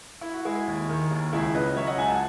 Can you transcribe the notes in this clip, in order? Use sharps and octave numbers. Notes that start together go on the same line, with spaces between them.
E4
F#4
G#3 E4 G#4
D#2
D#3
D#2
C#2 E4 G#4
C#3 B4 D#5
F#3 C#5 E5
D#5 F#5
C#2 E5 G#5
F#5 A5